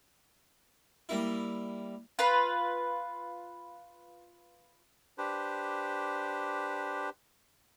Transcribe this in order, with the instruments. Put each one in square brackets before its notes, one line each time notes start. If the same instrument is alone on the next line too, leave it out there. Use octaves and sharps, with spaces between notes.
[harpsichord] G3 A#3 E4
[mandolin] F4 B4 B5
[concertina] D4 G4 B4 C5